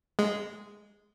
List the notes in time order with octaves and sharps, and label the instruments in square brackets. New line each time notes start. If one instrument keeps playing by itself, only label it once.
[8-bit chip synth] G#3